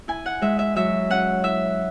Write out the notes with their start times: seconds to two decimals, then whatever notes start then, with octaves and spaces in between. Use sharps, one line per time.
0.08 E4 G#5
0.26 F#5
0.41 G#3 E5
0.59 E5
0.76 F#3 E5
1.10 C#4 F#5
1.43 E4 E5